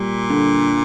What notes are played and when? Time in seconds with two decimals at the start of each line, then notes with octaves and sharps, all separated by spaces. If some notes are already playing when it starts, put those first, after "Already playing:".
Already playing: A#2 G3
0.30 D3